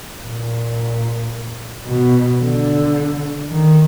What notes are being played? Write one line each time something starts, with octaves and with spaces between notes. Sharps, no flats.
A#2
B2
D3
D#3